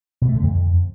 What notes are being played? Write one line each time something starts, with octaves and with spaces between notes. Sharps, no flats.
B2
A3
D3
F2